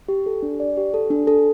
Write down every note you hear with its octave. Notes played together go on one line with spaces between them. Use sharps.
G4
A4
D4
D5
G4
A4
D4
A4